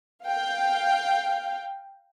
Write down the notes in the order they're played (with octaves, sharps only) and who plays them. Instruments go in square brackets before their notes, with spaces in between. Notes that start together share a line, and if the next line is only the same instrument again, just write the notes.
[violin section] F5 G5